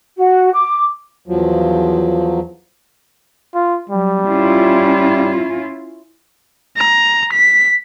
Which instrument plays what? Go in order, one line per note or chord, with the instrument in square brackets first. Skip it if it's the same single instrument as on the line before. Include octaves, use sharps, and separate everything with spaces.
[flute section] F#4
D6
[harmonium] E2 F3 F#3
[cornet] F4
[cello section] F#3 [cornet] G3
[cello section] C#4 E4 F4
[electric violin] A#5
B6